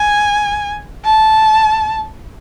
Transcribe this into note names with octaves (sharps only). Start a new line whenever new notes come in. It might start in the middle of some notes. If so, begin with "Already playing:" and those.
Already playing: G#5
A5